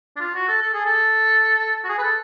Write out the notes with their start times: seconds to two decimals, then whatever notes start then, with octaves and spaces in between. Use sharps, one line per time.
0.16 D4
0.20 F4
0.35 F#4
0.48 A4
0.62 A4
0.74 G#4
0.85 A4
1.84 F#4
1.89 G#4
1.98 B4
2.02 A4